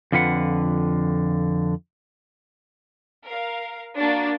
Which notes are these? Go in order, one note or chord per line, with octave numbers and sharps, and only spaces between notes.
F2 D3 F4 B4 F#5
A#4 F5
A#3 D4 F#4 A6